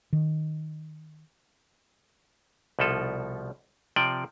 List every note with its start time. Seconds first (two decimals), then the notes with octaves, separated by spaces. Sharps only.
0.13 D#3
2.79 C2 B2 F3 A4
3.96 C3 F3 D5 G5